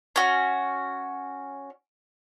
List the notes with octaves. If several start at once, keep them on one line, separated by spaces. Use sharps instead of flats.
C#4 F#4